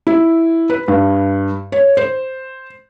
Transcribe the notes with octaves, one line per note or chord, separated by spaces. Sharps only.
E4
B4
G2
C#5
C5